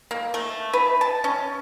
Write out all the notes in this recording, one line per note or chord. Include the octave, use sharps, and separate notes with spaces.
A#3
A3
B4
A5
C#4